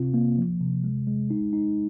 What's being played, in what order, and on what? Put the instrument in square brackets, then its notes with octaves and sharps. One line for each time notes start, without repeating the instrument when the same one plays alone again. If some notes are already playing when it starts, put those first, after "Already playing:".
Already playing: [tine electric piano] C3 C4 F4
A#3
F3
C3
G#3
G#3
D#4
D#4